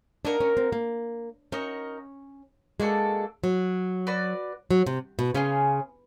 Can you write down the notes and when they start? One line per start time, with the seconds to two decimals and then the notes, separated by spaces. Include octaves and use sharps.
0.25 A#3 D4 D#4 F#4 A#4
0.40 C#4
0.57 C4
0.72 A#3
1.52 C#4 D#4 F#4 A#4 D#5
2.80 G#3 A#3 D4 F#4 A4
3.44 F#3
4.07 F#4 B4 D5
4.71 F#3
4.86 C3
5.19 B2
5.34 C#3 C#4 F4 G#4